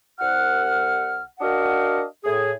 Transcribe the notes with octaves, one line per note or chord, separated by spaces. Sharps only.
C2 F#5 F6
D4 F#4 A#4 D#5 F5 F#5
A2 G#4